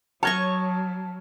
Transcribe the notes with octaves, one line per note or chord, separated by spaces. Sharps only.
F#3 C#5 D#5 A5 C#6 F6 G#6